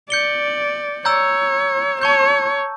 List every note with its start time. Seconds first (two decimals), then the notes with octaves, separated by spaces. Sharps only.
0.10 D5 G6 C#7 G7
1.05 C#5 A#5 E6 G6
2.01 C#5 A5 C#6 G6